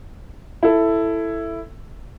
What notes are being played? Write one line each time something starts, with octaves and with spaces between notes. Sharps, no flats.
E4 A4